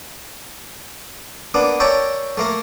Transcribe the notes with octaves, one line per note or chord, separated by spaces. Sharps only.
A#3 B3 D4
A#4 C#5 D5 E5 G5 A5
A3 A#3 A#4